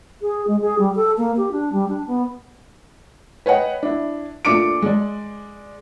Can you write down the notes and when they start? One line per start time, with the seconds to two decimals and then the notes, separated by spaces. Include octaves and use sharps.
0.22 G#4
0.47 G#3
0.61 G#4
0.79 G3
0.95 A4
1.18 A#3
1.37 G4
1.52 D4
1.72 G3
1.89 D4
2.07 B3
3.46 B4 C#5 D#5 F#5 G5
3.83 D4 E4
4.45 A#2 A3 D4 D6 C#7 D7
4.82 G#3 D5